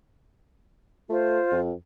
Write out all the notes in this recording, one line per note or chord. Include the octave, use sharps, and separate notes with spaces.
A3 F4 C5
F2